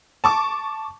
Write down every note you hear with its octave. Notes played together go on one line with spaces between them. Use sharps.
A5 C#6 D6